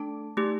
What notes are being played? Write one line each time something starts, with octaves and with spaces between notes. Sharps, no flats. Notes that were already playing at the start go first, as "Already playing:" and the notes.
Already playing: A3 D4 A4 A5
A3 D#4 G4